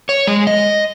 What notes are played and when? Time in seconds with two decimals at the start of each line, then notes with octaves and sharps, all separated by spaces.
0.09 C#5
0.27 G#3
0.47 D#5